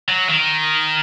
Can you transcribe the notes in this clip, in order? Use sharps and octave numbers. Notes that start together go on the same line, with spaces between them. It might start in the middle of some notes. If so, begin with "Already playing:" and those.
F#3
D#3